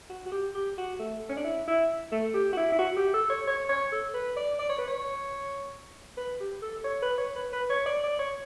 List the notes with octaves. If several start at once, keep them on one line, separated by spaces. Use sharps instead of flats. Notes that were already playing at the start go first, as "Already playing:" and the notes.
F#4
F#4
G4
G4
F#4
A3
C#4
D4
E4
E4
A3
G4
F#4
E4
E4
F#4
G4
A4
C#5
C#5
C#5
A4
B4
D5
D5
C#5
B4
C#5
B4
G4
A4
C#5
B4
C#5
B4
B4
C#5
D5
D5
C#5